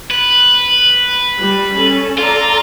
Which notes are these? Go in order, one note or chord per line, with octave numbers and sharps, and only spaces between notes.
B4
G3
C#4 A4
F4 A4 D5 A#5